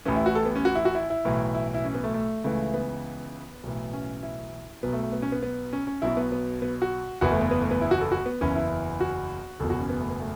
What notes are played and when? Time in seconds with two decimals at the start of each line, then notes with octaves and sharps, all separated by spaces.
0.05 A1 A2 E3 C#4
0.16 E4
0.26 F#4
0.35 A4
0.45 B3
0.56 C#4
0.65 F#4
0.75 E4
0.85 F#4
0.95 E4
1.10 E4
1.25 B1 A2 E3
1.55 E4
1.74 E4
1.85 C#4
1.94 B3
2.04 A3
2.14 A3
2.44 C#2 C#3 E3 A3
2.74 B3
3.63 B1 A2 E3
3.93 C#4
4.23 E4
4.83 B1 B2 B3
4.93 A3
5.03 A3
5.12 B3
5.22 C#4
5.32 B3
5.43 B3
5.73 C#4
5.87 C#4
6.02 B1 B2 E4
6.17 B3
6.32 B3
6.62 B3
6.82 F#4
7.21 F#1 E2 E3 F#4
7.32 A3
7.41 B3
7.51 B3
7.61 A3
7.71 B3
7.81 E4
7.91 F#4
8.01 A4
8.11 F#4
8.26 B3
8.41 F#1 E2 E3 C#4
8.55 E4
9.00 F#4
9.60 F#1 E2 B2 A4
9.70 F#4
9.80 C#4
9.90 B3
10.00 A3
10.10 B3
10.20 A3